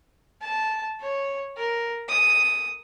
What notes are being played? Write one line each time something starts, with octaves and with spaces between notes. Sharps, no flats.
A5
C#5
A#4
D#6